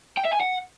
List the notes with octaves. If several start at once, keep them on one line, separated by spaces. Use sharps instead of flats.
G5
E5
G#5
F#5